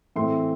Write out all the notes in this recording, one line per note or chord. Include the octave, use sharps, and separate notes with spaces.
A2 E3 A3 C4 C6